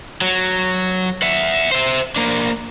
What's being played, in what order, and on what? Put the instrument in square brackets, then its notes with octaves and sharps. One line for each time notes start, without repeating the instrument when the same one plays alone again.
[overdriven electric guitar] F#3
E5 F#5
C5 E5
A#3 D4